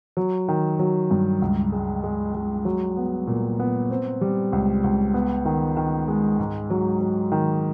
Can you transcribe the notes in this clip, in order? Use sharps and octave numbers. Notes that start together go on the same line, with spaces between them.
F#3
D#3
F#3
G2
C#2
G#3
G#3
G#3
F#3
B3
A#2
B3
C4
G3
C#2
C#2
B3
D#3
D#3
G#3
G#2
F#3
F#3
D#3